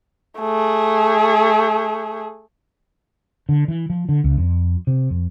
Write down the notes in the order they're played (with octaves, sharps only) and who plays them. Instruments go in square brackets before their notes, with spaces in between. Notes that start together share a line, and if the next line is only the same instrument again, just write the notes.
[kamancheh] A3 G#4
[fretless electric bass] D3
E3
F3
D3
C#2
F2
C3
F2